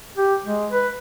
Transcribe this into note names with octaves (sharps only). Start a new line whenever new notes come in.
G4
G#3
B4